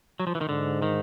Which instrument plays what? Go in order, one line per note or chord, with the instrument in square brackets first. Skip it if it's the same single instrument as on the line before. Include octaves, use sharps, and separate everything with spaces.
[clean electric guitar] F#3
F3
E3
D#3
[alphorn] G#2 [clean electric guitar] D3
[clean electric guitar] D#3